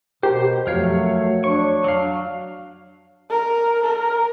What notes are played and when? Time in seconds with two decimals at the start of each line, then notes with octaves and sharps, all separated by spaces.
0.23 B2 G4 A#4 C5
0.67 F2 F#3 A3 A#4 C#5 F5
1.44 D4 C#5 C#6
1.84 F#3 F5
3.30 A#4
3.83 A#4